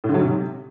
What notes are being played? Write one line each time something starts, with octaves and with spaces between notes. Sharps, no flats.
A2
D3
F#3
G#2
C3